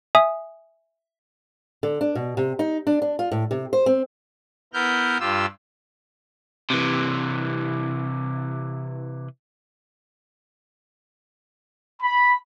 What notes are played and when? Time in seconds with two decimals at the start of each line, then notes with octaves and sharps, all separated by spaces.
0.15 E5 G#5 D#6
1.83 D3
2.01 D4
2.15 B2
2.37 C3
2.59 D#4
2.87 D4
3.02 D4
3.19 F4
3.32 A2
3.51 C3
3.73 C5
3.86 C4
4.73 B3 E4 A#4 F6 G6
5.20 G2 F4 G4 E6
6.70 C3 E3
12.01 B5